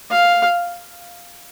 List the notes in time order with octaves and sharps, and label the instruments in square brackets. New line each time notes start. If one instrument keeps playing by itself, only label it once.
[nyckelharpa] F5